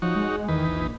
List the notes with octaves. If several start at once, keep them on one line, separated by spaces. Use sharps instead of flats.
F3 D#4 F#4 C#5
G#3
E2 D#3 D#4 B4
A#1